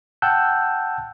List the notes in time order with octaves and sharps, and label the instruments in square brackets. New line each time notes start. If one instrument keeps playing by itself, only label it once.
[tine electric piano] F#5 G5 A5 E6 F#6 G6